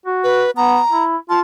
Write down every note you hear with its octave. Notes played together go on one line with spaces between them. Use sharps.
F#4
B4
B3 A#5
E4
F4 A5